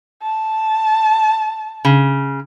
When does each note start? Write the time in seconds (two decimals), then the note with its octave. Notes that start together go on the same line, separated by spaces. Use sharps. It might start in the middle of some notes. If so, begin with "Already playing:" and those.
0.22 A5
1.85 C#3